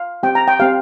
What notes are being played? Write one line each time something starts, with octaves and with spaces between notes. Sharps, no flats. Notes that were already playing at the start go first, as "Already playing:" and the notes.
Already playing: F5
C4 G4 G5
A#5
G5
C4 G4 F5